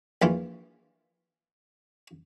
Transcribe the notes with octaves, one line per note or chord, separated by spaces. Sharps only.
A#1 E3 F4